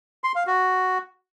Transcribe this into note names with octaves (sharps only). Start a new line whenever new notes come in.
C6
F5
F#4